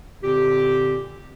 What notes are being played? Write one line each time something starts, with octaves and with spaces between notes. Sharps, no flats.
A#2 D3 C4 G4